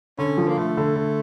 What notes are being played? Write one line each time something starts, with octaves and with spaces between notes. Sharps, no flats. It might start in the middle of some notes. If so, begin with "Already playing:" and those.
D3 C#4
F3
A#3
D3 A3
D3
D3